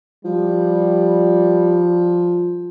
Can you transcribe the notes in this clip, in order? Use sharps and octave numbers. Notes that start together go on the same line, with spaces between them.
F3 G3